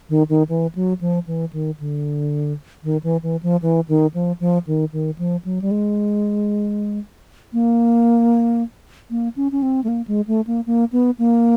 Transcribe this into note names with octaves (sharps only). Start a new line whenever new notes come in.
D#3
D#3
E3
F#3
F3
E3
D#3
D3
D#3
E3
E3
F3
E3
D#3
F3
F3
D#3
D#3
F3
F#3
G3
G#3
A#3
A#3
C#4
C#4
C4
A3
A#3
G#3
A3
A#3
A#3
B3
A#3